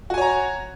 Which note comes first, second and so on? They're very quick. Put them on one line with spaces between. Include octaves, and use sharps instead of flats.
F#4 G#5 C#5 A#5